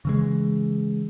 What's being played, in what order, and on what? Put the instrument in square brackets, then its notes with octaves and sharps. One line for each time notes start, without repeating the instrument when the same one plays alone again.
[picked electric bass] C#3 E3 G#3